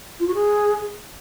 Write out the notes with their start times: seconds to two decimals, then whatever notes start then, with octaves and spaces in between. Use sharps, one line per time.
0.20 F4
0.27 F#4
0.35 G#4